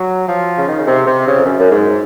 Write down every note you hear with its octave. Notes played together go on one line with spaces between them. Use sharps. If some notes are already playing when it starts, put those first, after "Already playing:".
Already playing: F#3
F3
C#3
D#3
C#3
C3
C3
C#3
F2
F#2
F#2
G#2